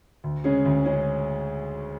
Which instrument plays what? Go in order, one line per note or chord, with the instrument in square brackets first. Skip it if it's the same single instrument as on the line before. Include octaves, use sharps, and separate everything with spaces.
[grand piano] D2
C#3 G#3 C#4 G#4
D2
C#3 G#3 C#4 G#4